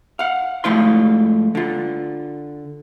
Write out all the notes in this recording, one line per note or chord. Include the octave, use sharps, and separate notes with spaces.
F5 F#5
G#2 F3 A3 E4 F5 C6
D3 F4